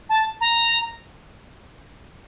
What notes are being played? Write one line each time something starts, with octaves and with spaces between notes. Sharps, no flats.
A5
A#5